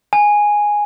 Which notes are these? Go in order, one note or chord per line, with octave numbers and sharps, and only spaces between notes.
G#5